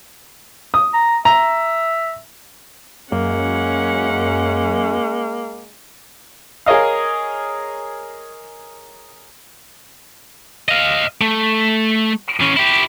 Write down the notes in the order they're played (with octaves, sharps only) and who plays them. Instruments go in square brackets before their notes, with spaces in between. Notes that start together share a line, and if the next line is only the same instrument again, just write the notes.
[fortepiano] D#6
[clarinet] A#5
[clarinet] E5 [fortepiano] A#5
[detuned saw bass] F#2 [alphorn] G#3 [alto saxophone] A#3 [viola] C#4 F#5
[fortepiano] G#4 A#4 C#5 D#5 F5
[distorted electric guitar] D#5 F5
A3
E3 C#4
E4 G4